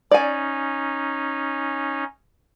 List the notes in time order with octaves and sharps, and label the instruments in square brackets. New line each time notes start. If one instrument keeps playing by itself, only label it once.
[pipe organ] C#4 D#4 [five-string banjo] D5 G#5